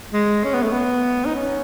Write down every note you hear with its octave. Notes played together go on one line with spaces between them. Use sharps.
G#3
C#4
B3
A3
B3
D#4
C#4